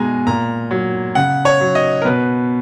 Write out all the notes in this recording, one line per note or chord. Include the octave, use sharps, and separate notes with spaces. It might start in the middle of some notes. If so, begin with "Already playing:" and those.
Already playing: B2 G#3 G#5 A#5
A#2 A#5
F#3
C#3 F#5
C#5
F#3
D#5
A#4
B2 B4